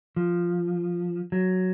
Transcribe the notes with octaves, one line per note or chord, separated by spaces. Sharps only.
F3
F#3